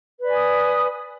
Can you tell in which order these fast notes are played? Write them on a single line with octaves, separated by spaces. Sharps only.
B4 D5 G#5 D#6